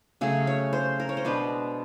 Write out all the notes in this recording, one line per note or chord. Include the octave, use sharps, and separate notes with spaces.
C#3 F#3 A3 G#4
C#5
C5
A#4
C#5
C5
B2 G#3 B3 D4 B4